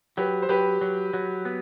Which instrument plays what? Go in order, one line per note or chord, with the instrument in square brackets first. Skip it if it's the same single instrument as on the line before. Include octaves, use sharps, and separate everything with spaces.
[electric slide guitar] F#3 [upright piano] G4 B4
[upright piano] C5
[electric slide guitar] F#3 [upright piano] G4 B4
[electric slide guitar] F#3
F#3
B3